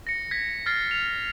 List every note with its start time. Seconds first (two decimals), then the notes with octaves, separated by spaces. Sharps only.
0.07 A#6 C#7
0.31 G#6 B6
0.66 F6 G#6 A6 C7
0.91 F7